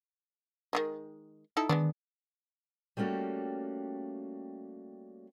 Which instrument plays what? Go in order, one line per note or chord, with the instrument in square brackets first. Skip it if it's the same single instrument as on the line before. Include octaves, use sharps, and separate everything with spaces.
[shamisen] D#3 E3 G#3
D#4 E4 A4
[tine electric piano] D#3 [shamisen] G#3 B3 D4
[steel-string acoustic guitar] G3 A3 A#3 C#4 F#4 G4